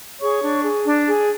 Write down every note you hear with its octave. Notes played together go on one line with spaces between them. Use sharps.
G#4 C#5 C#6
D4
G#4
D4
G#4